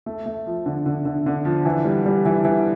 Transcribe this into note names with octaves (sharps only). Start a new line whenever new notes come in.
A3
A3
F3
D3
D3
D3
D3
F3
E3
G3
G3
E3
E3